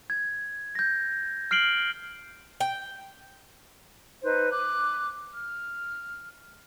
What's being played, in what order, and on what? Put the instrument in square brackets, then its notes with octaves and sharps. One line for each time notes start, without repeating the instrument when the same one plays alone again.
[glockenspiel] G#6
G6 A#6
F6 C7 D7 F#7 G7
[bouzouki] G5
[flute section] D#4 B4 C5
D6 F#6
F6